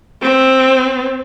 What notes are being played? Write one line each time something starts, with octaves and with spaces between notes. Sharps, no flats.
C4